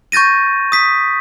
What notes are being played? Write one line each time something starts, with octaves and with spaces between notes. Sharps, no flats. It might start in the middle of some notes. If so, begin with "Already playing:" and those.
C#6 G6 A6 A#6 D#7
D#6 B6